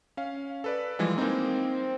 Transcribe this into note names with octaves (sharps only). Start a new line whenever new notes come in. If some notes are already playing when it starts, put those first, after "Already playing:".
C#4 F5
A4 B4 D5
E3 F3 G3 G#3
A#3 C4 D#4